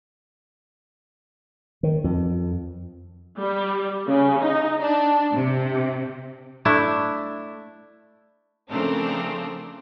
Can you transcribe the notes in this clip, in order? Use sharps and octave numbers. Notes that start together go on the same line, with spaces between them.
D#3
F2
G3
C#3
D#4
D4
C3
A3 D4 E4 E5
C#3 F3 A3 C4 D4 A#4